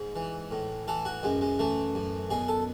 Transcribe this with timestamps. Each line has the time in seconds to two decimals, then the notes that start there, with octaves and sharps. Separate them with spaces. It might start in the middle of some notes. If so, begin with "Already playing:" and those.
Already playing: G#2
0.16 E3
0.51 A2
0.88 E3 A4
1.05 F#4
1.23 F#2 G#3
1.41 G#3
1.59 E3 A3
1.95 F#2
2.30 B2 G#4
2.48 A4